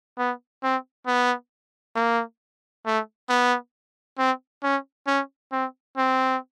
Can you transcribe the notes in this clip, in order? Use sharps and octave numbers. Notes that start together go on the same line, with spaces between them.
B3
C4
B3
A#3
A3
B3
C4
C#4
C#4
C4
C4